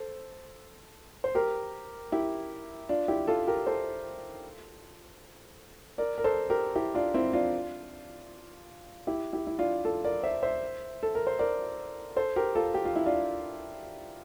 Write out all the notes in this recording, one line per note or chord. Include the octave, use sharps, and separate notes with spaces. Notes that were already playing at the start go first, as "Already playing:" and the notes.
Already playing: A4 C5
C5
G4 A#4
E4 G4
D4 F4
E4 G4
F4 A4
G4 A#4
A4 C5
A#4 D5
A#4
A4 C5
G4 A#4
E4 G4
D4 F4
C4 E4
D4 F4
E4 G4
E4 G4
E4
D4 F4
F4 A4
A#4 D5
C5 E5
C5 E5
A4
A#4
C5
A#4 D5
A4 C5
G4 A#4
F4 A4
G4
F4
E4
D4 F4